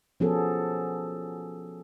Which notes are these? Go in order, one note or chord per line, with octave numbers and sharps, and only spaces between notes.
F3 B3 C#4 F#4 G#4 A4